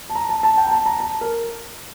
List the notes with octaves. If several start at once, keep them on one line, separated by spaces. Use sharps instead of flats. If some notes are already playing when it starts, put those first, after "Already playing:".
A5
A#5
A5
A5
G5
A#5
A5
A#5
A5
A#4